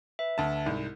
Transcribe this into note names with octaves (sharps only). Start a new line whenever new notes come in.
B4 E5
D2 A5
C2 G#2